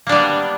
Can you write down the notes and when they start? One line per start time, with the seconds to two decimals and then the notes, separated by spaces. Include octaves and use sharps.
0.07 A#3
0.09 D4
0.12 G3
0.15 B3